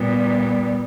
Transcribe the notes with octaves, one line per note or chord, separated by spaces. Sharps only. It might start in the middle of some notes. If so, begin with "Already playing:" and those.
Already playing: A#2 G3 B3